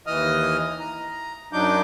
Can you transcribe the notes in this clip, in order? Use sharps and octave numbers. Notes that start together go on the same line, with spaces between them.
D#2 E3 D#5 D#6 F6
A#5
F#2 F#3 D4 D#4 D6 G6